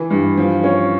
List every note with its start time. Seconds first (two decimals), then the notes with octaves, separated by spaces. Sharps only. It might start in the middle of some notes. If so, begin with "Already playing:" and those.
Already playing: E3
0.10 G2
0.37 F3
0.64 C#4